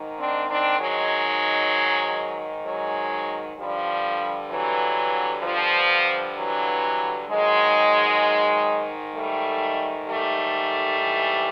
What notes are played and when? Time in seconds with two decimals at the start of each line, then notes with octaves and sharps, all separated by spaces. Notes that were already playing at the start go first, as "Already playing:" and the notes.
Already playing: G#2 D#3
0.18 C4 D4
0.49 C4 D4
0.79 F#3 G#3
2.65 F#3 G#3
3.57 G2 D3 F3 G3
4.50 E3 F#3
5.43 F3
6.36 E3 F#3
7.28 G#2 D#3 F#3 G#3
9.14 G3 A3
10.08 G3 A3
10.99 G#2 E3